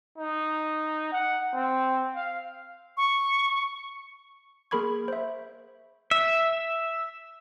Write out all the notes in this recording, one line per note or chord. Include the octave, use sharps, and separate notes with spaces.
D#4
F#5
C4
F5
C#6
A#3 G#4 A#4 B5 C#6 G#6
C5 E5
E5